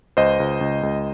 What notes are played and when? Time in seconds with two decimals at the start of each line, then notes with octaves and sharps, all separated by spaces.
0.17 C#2 C5 D#5
0.40 C#2
0.61 C#2
0.83 C#2